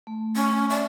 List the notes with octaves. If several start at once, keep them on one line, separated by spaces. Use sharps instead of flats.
A3
C#4
D5 E5